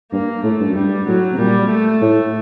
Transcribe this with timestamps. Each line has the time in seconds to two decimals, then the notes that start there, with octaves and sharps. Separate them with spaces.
0.12 G2 A#3
0.44 A2 A3
0.60 G2
0.68 F#2
0.75 G2 G3
1.07 A2 F#3
1.33 C3
1.39 A#2 G3
1.70 A3
2.02 A2